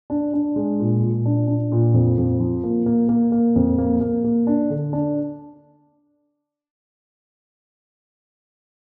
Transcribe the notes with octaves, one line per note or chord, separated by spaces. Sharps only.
D4
D4
G#3
A#2
A#2
D4
D4
A#2
F2
F2
F3
A#3
A#3
A#3
A#3
F2
A#3
A#3
A#3
D4
D3
D4